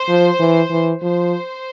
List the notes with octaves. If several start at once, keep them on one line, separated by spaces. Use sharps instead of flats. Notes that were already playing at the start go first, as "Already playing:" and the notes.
Already playing: C5
F3
E3
E3
F3 C5